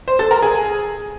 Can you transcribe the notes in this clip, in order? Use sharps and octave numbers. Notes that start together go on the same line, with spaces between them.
C5
A4
A#4
G#4